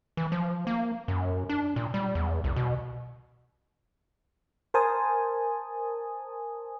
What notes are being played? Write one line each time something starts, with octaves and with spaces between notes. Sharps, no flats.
E3
F3
A#3
F#2
D4
A#2
G3
E2
C2
B2
A#4 C5 G#5 A5 D#6